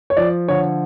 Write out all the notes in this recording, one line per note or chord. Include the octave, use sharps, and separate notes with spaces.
C#5
F3 D5
D3 C#5